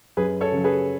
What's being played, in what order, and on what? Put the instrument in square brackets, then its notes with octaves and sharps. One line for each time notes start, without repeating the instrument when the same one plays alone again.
[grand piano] F#2 G#4 B4
A4 C#5
C#3 F#3
G#4 B4